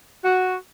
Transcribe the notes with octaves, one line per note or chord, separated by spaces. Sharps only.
F#4